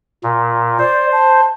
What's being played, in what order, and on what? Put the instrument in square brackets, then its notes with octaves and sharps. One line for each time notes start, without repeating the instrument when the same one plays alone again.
[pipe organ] A#2
[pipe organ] C5 [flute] D5
[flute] A5